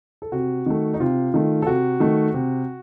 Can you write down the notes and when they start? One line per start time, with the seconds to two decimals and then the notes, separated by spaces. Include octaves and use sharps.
0.22 A4
0.32 C3 F#4
0.66 D#3 A3
0.94 D#4
1.00 C3 F4
1.34 D#3 A3
1.62 A4
1.67 C3 F#4
2.00 D#3 A3
2.34 C3